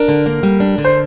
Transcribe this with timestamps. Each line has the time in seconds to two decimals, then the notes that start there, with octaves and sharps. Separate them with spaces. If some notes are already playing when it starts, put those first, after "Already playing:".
Already playing: D4 A#4
0.08 D3
0.26 A#3
0.43 G3
0.60 D4
0.78 D3
0.85 C5